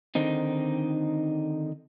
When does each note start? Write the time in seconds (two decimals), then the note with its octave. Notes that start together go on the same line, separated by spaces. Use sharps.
0.15 D3 D#3 C4 D#4